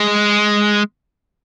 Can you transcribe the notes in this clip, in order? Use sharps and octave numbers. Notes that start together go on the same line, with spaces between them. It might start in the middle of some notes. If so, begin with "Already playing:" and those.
Already playing: G#3